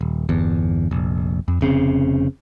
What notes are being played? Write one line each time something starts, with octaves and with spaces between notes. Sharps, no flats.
D#1
G1 E2
F1 A#1
F2
F1 C#3 C4